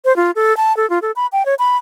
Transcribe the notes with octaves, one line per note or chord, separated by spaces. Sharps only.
C5
F4
A4
A5
A4
F4
A4
B5
G5
C#5
B5